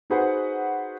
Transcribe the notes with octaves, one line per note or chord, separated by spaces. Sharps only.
D#4 F#4 G#4 B4 C5 F#5